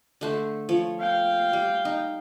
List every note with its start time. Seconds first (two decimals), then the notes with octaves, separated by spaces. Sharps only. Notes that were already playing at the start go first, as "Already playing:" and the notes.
0.21 D3 A3 C5
0.69 F3 C#5
1.00 F5 G5
1.53 G3
1.85 D#4